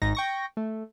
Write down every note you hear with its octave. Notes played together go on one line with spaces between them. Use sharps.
G#1 G#2 D#4 A#6
G5 C#6 A#6
A3